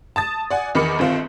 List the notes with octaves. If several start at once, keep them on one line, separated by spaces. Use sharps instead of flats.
A5 D#6 A6
D5 F#5 G#5
E2 D#3 A#4 B5 D6 C#7
G1 D#3 C4 F4